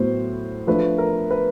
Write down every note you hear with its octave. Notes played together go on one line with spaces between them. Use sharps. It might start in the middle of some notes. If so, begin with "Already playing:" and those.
Already playing: A2 F#3 B3 C5
F3 A3 D4 B4
A#4
B4